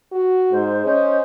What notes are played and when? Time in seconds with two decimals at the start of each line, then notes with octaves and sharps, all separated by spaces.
0.12 F#4
0.52 G#2 C5
0.86 C#4 C5 D#5